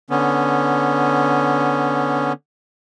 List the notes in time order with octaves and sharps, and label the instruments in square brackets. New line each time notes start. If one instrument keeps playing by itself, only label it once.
[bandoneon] D3 B3 C#4